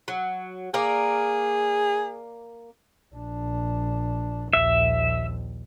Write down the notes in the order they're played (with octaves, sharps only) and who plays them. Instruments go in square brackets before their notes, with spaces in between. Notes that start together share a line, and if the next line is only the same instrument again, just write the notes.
[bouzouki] F#3
[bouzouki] A#3 A#4 D5 [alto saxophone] G#4
[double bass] A#1 D4
[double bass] A#1 D#2 [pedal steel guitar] E5